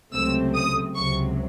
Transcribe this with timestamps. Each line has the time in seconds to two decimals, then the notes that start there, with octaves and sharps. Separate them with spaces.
0.13 C#2 C3 F#3 A3 C4 E6
0.55 D#6
0.95 C#2 C3 F#3 C#6